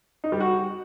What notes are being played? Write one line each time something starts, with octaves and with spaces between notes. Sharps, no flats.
D#4
G3
F#4